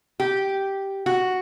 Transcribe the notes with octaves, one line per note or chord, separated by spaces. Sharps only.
G4
F#4